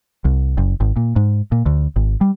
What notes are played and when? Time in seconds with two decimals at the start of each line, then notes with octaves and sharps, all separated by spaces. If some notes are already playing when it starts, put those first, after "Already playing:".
0.25 C2
0.57 F#1
0.80 G#1
0.96 A#2
1.16 G#2
1.52 A#2
1.66 D2
1.96 G#1
2.21 G3